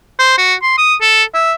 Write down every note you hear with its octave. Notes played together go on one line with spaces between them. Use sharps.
C5
F#4
C6
D#6
A4
E5